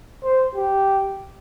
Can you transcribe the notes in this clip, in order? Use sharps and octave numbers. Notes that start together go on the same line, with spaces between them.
C5
G4